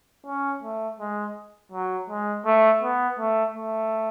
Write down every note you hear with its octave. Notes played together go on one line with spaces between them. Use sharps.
C#4
A3
G#3
F#3
G#3
A3
B3
A3
A3